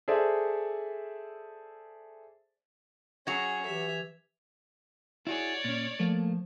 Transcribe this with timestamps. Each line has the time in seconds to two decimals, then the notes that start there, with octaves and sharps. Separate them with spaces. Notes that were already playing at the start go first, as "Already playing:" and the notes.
0.08 G#4 A4 C5 D5 E5
3.27 F#3 C#4 F#4 G#4 G#6 F7
3.66 E3 G4 E5
5.27 E4 F#4 G#4 C#5 D5
5.65 A#2 C#4
5.99 F3 A3 A#3